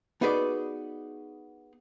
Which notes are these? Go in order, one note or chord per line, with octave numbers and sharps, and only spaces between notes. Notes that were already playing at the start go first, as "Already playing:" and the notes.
B3 D#4 F#4 G#4 B4 D5